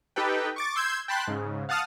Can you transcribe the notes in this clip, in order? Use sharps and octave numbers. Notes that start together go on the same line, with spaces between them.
D#4 G4 A4 B4 G5
C#6 D6 A6
C6 E6 G6 G#6
G5 A5 B5 C6 F#6
G#2 C#3
F5 F#5 A5 D#6 F6